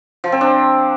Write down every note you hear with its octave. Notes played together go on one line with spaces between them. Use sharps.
F3
C4
D4